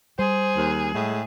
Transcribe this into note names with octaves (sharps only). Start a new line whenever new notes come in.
G3 G#4 C5
D#2
A2 G#3